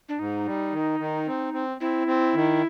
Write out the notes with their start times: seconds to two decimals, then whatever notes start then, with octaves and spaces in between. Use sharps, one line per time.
0.09 D4
0.19 G#2 D#4
0.46 G3
0.73 D#3
1.00 D#3
1.27 C4
1.54 C4
1.81 C4 E4
2.07 C4
2.35 D#3